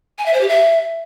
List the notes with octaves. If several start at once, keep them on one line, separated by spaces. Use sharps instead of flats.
G#5
E5
C5
G4
E5